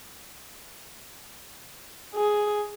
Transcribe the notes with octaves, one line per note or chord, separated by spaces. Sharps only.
G#4